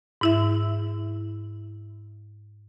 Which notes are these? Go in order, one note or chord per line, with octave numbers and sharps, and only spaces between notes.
G#2 E4 E5